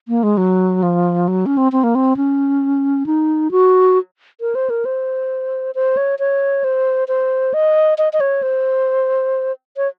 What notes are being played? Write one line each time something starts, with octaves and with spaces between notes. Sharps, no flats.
A#3
G#3
F#3
F3
F#3
C#4
C4
C4
A#3
C4
C#4
D#4
F#4
A#4
C5
A#4
C5
C5
C#5
C#5
C5
C5
D#5
D#5
D#5
C#5
C5
C#5